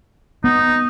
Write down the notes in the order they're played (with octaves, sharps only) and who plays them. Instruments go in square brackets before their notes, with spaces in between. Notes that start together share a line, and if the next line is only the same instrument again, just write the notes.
[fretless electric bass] B3 [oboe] D#4